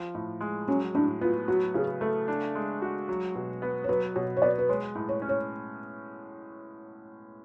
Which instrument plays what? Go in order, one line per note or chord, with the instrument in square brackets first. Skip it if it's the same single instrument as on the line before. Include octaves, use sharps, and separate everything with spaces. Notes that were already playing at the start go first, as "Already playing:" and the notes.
Already playing: [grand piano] F3
A2
G#3
[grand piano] F#3 [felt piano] C#4
[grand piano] A2 [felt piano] D4
[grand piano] B3 [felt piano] F4
[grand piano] F#3 [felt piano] F#4
[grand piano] C#3 [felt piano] G#4
[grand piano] A3 [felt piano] A4
[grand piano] D4
G#3
F#4
F#3
B2
B3
[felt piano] C#5
[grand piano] F#3 [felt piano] B4
[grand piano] B2 [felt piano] C#5
[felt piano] C#5
[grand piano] B3 [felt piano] D5
[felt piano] B4
[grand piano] G#3 [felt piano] C#5
[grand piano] A2
[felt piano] C#5
[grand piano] C#4
[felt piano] C#5